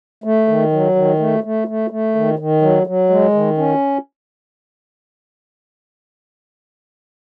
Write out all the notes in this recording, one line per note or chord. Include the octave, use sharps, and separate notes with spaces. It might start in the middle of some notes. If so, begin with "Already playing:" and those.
A3
D#3
F#3
D#3
A3
A3
A3
A3
D#3
D#3
F#3
F#3
G#3
D#3
C#4